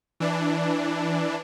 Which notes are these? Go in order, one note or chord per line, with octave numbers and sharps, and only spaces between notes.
E3 D4